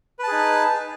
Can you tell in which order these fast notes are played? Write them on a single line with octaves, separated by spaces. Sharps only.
B4 A5 G#4 D#4